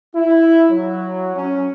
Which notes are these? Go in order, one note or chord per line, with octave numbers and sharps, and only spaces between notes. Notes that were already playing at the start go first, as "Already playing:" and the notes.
E4
F#3
C#4